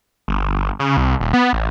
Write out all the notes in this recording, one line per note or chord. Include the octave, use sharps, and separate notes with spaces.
G1
C#3
C2
D#1
B3
A1